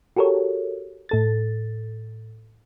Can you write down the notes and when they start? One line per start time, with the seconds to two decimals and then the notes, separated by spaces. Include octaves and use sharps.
0.16 F#4 G4 A4 A#4 C#5
1.09 A2 A4 A6